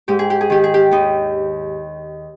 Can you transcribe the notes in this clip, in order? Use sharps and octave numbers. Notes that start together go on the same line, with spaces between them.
G#2 G4
G#4
G4
G#4
D#3 G4
G#4
G4
D#2 D#4